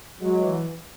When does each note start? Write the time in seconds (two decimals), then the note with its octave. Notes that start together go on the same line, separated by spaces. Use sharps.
0.20 F#3 G#3
0.42 E3